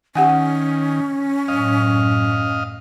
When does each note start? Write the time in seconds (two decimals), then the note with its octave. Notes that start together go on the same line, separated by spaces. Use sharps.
0.15 D#3 C#4 G4 F#5 G#5
1.48 F#2 A2 D#5 F5